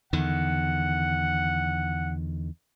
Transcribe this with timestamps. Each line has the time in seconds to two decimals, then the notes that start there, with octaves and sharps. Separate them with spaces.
0.13 E2 D3 D#3 F#5